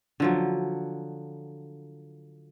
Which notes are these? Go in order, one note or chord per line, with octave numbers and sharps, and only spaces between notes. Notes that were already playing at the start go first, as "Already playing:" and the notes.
D3 F3 F#3